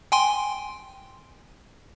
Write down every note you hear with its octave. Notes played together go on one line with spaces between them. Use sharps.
G5 G#5 C6